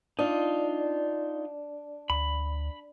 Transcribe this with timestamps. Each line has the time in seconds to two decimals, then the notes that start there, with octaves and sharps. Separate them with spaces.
0.19 D4 D#4 F4
2.10 D2 B5